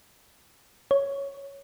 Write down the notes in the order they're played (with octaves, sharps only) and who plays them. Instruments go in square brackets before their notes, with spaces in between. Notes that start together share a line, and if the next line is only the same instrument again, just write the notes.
[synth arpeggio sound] C#5